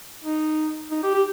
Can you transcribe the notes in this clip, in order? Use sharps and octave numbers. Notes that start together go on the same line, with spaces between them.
D#4
D#4
G4
G4